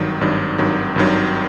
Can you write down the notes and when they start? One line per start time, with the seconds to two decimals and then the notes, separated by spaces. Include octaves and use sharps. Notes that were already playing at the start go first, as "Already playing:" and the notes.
Already playing: G#1 G2 D#3 F#3
0.21 G#1 G2 D#3 F#3
0.58 G#1 G2 D#3 F#3
0.96 G#1 G2 D#3 F#3